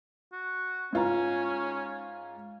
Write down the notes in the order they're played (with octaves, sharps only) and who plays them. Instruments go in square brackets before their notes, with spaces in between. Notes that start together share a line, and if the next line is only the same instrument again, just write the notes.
[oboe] F#4
[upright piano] G#2 F4 A#5 [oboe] C#4